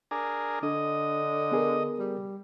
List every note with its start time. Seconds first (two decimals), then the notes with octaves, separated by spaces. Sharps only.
0.11 D4 G#4 A#4
0.63 D3 D4 D#5
1.52 B3 G#4 A#4
1.99 G3